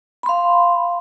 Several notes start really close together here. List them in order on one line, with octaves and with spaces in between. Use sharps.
B5 C6 F5